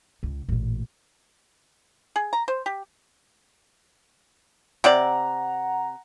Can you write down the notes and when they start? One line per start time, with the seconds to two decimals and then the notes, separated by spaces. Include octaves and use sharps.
0.23 C#2
0.49 A1 A#2
2.16 G#4
2.33 A#5
2.48 C5
2.66 G4
4.84 C3 C4 D5 F#5 A#5